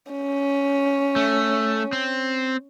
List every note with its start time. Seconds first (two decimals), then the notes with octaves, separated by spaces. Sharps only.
0.11 C#4
1.16 A3
1.93 C4